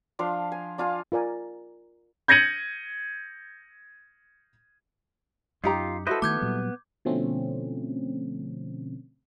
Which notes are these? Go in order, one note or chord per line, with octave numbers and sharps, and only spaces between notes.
F3 D4 F5 C6
G#5
D4 F4 F5 G#5
F4 A#4 D5 G#5
G6 G#6 A#6 C#7 D#7 F#7
F#2 D#4 F4 G4 A#5
E4 F#4 A4 B4 C5 D#5
D#3 A3 B3 D6 G6 G#6
A#2 F#3 G3
B2 D3 F3 A3 C4 C#4